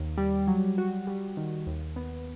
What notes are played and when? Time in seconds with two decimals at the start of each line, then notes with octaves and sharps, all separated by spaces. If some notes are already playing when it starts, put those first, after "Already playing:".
Already playing: D#2
0.18 G3
0.47 F#3
0.78 F#4
1.07 G3
1.37 D#3
1.66 D#2
1.96 B3